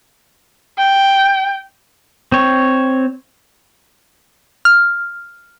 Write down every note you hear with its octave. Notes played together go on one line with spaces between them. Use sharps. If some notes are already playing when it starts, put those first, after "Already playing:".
G5
C4 C#5
F6